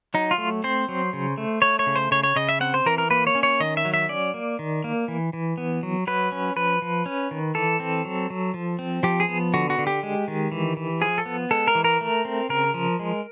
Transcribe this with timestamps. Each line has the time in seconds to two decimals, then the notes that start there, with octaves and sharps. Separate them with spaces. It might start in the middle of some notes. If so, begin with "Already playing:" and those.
0.14 F#3 D#4
0.31 F4
0.38 A3
0.64 C4 C5
0.89 F#3
1.13 C#3
1.38 A3
1.62 A3 C#5
1.79 C#5
1.86 C#3
1.96 C5
2.11 C#3 C#5
2.23 C#5
2.36 C#3 D#5
2.49 E5
2.61 C4 F#5
2.74 C5
2.86 E3 A#4
2.98 A#4
3.10 A#3 B4
3.27 C#5
3.35 C#4
3.43 C#5
3.60 D#3 D#5
3.77 E5
3.85 F#3
3.94 E5
4.09 C#4 D5
4.34 A#3
4.59 D#3
4.84 A#3
5.08 E3
5.33 E3
5.58 B3
5.83 F#3
6.07 F#3 B4
6.32 C#4
6.56 F3 B4
6.82 F3
7.06 C#4
7.31 D#3
7.55 E3 A4
7.80 C4
8.05 F#3
8.30 F#3
8.54 F3
8.79 C4
9.03 F3 G4
9.20 G#4
9.28 B3
9.54 D3 F#4
9.70 F#4
9.78 D3
9.87 G4
10.03 G#3
10.28 D#3
10.52 E3
10.77 E3
11.01 F3 G#4
11.18 A4
11.26 B3
11.51 G#3 A4
11.68 A#4
11.75 E3
11.84 A#4
12.01 A3
12.25 C4
12.49 C#3 A#4
12.74 F3
12.99 G#3